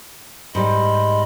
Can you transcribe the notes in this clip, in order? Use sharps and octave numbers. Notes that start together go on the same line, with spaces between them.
G#2 G3 D#5 B5 C6